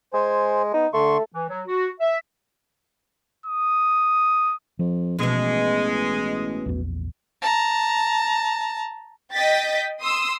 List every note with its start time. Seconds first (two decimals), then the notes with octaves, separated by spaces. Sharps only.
0.14 G#3 C5 G#5
0.74 B3 D#4
0.94 D3 A3 C6 C#6
1.33 E3
1.49 F#3
1.67 F#4
2.00 E5
3.46 D#6
4.79 F2 F3
5.19 A1 B2 E3 G#3
6.66 A#1 E2
7.42 A5 A#5
9.34 D#5 G5 G6 A6 B6
10.02 C6 D#6 E6